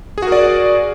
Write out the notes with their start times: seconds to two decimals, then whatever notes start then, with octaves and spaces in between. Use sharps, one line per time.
0.18 G#4
0.22 F#4
0.27 A#4
0.32 D5